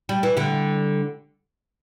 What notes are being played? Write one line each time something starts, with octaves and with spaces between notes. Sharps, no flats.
G3
E3
D3 G3